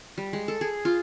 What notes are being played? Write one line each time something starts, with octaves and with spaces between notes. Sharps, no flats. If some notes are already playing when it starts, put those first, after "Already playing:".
G3
G#3
A4
G#4
F4